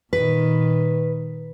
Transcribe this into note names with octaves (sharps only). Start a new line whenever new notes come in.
A#2 D#3 B4